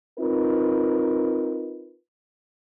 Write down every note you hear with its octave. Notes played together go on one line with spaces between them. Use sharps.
C4 D#4 F4 A#4 B4